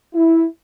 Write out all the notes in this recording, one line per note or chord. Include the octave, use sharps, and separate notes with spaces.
E4